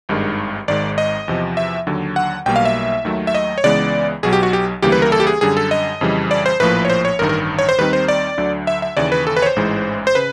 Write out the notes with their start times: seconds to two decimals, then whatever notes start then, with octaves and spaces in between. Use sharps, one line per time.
0.09 G#1 G2 D#3 G#3
0.68 G#1 G#2 D#3 G#3 D5
0.98 D#5
1.28 E2 C3 F3
1.57 E5
1.87 D#2 D3 F#3
2.16 F#5
2.46 B1 B2 G3 A#3 G5
2.56 F5
2.65 E5
3.05 D#2 D#3 F#3 A3
3.27 E5
3.35 D#5
3.58 C#5
3.64 C#2 C#3 E3 G#3 B3 D5
4.23 B1 B2 F#3 G#4
4.33 G4
4.43 F#4
4.53 G4
4.82 D2 C#3 E3 G3 A#3 G4
4.92 B4
5.02 A#4
5.12 A4
5.20 G4
5.27 G#4
5.41 F#2 D3 G3 G#4
5.57 A4
5.71 D#5
6.01 F2 C#3 E3 G3
6.31 D5
6.46 C5
6.60 A#1 A2 F3 A#3 B4
6.85 C#5
6.90 C5
7.05 C#5
7.19 A1 G2 D#3 A#4
7.29 A#4
7.59 C#5
7.69 C5
7.78 D#2 D#3 G3 C4 D#4 B4
7.93 C5
8.08 D5
8.38 D2 D3 F#3
8.67 E5
8.82 E5
8.97 D#2 C#3 E3 D5
9.12 B4
9.27 A4
9.37 B4
9.42 C#5
9.46 C5
9.56 A1 G#2 E3 G#3
10.07 C5
10.15 C#3 B4